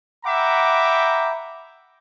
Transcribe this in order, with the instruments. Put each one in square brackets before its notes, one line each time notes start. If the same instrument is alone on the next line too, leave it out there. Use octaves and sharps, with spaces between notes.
[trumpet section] E5 F#5 G5 A#5 B5 D6